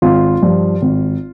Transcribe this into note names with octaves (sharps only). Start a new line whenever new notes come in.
G#1 F4
G2 F3
G#1